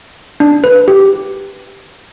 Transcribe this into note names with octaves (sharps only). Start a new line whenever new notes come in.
D4
B4
G4